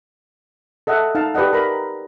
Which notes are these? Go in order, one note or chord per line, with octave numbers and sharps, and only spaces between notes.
A4 D#5 E5 F#5
D#4 F5 A5
G4 B4 D5 D#5 F#5
A#4 A#5 B5